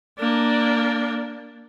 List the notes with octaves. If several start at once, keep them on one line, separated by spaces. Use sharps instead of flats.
A#3 D4